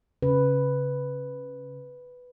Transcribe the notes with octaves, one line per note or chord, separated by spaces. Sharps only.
C#3 B4